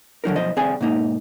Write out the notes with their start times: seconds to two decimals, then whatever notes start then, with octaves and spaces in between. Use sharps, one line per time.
0.24 D3 F#3 D#4 A#4
0.35 B1 F3 C5 D#5
0.56 C2 C4 G#4 D5 G#5
0.81 G#2 B2 A#3 D#4